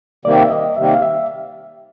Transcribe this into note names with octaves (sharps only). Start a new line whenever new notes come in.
C3 D#3 G3 A#3 D5
E5
D#5
C3 D#3 G3 A#3 E5
F5
E5